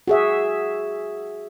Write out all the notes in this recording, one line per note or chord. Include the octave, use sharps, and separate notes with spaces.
F#4 G#4 E5